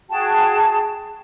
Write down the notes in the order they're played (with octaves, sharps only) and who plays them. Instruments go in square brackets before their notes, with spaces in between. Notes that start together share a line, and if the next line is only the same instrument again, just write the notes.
[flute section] F#4 G#4 G5 A5